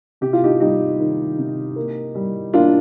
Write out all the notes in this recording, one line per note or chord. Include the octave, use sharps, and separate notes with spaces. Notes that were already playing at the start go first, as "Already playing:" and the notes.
C3 G4
F4
D#4 G4
G3 D#4 G4
D#3
C3
A#3
G3
A#3 D4 F4